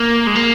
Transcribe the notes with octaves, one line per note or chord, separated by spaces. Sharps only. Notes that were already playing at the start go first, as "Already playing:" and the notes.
Already playing: A#3
G#3
A#3